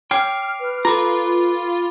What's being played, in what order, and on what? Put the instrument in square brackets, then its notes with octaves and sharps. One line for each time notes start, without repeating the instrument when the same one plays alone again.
[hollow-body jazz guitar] C#5 G5 [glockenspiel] D6 C7 D7 [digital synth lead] F6
[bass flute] B4
[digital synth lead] F4 [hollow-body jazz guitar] A4 A#5 [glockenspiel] B5 D6